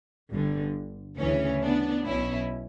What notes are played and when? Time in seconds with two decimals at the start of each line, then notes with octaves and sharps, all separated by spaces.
0.32 G1 G2 D3
1.18 D2 C#3 E3 C#4
1.62 B3 D4
2.05 B1 B2 C#4 E4